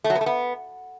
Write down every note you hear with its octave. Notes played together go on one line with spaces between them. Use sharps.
A3
F#3
B3
A3
B3